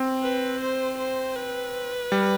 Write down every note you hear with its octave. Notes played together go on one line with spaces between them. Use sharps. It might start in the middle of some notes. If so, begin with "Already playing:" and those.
Already playing: C4
B4
C5
C5
B4
G3